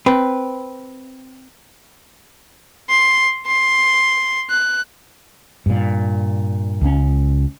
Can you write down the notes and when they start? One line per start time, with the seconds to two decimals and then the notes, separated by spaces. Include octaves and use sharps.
0.06 C4 B4
2.90 C6
3.47 C6
4.50 F#6
5.66 G2 A#2
6.81 C#2 C#4